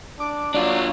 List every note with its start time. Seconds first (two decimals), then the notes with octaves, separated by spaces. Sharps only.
0.20 D4 D6
0.54 F#3 D4 F4 D5